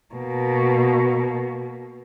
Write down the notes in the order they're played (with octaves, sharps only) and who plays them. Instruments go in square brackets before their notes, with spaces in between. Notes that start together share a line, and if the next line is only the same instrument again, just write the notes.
[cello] B2 A#3